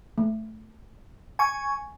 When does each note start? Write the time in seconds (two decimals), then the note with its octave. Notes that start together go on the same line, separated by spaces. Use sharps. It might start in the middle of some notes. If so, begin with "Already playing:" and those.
0.18 A3
1.39 G#5 C#6